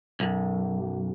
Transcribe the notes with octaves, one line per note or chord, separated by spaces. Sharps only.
B1 F#2